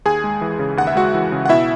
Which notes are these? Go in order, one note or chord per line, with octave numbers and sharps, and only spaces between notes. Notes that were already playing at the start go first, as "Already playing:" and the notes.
D#2 G#4 G#5
G#3
E3
C#3
D#2 F#5
E5
G#3 F#4 F#5
E3
C#3
F#5
B2 E4 E5